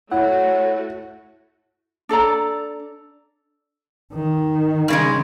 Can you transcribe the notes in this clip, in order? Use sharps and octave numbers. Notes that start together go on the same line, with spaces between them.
A3 E4 F#4 C#5 F#5
D4 A4 D5 A#5
D#3
G2 C#3 G#3